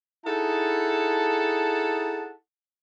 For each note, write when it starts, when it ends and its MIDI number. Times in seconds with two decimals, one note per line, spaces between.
0.25 2.31 63
0.25 2.31 64
0.25 2.31 68
0.25 2.31 69
0.25 2.31 78
0.25 2.31 81